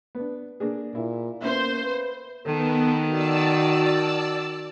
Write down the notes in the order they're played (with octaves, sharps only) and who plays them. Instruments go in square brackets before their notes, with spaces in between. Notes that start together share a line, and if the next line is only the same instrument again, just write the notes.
[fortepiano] B3 D4
A#3 D4 G#4
[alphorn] A#2 [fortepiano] E4
[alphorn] A#3 [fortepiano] B3 C#4 E5 [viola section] C5
[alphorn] B4
[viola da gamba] D#3 [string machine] B3 [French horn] A4
[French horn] F#4 [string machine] D5 A5 E6